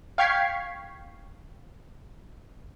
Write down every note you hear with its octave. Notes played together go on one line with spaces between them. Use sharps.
F5 G5 C#6 G#6 B6 C7